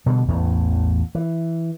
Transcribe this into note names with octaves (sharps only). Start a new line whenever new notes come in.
B2 D3 G3
A1 E2 A2
E3